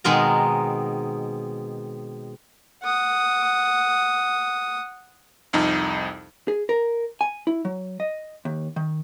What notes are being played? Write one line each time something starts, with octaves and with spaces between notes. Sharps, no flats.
B2 D#3 G#3 C4 A#4 A#5
F#5 D#6
C2 F2 D#4
G#4
A#4
G#5
E4
F#3
D#5
D#2
D#3